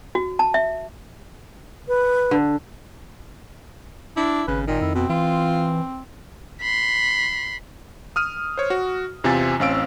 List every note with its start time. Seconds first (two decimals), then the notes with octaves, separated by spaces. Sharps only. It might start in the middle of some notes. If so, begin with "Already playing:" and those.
0.15 F#4
0.39 A5
0.54 E5
1.88 B4
2.31 D3
4.16 D4 E4
4.48 G#1 C#3 B4
4.67 A#2 D#3
4.81 F2 E4
4.95 B2 C4
5.09 E3 F4
6.61 B5 C6
8.16 D#6 F6 D#7
8.57 C5 C#5
8.70 F#4
9.24 E2 C3 C4 F4 G#5 A6
9.60 A1 C4 C#4 F5 E6 D7